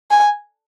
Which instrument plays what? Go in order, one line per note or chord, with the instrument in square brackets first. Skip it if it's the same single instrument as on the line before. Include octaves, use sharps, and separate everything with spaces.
[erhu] G#5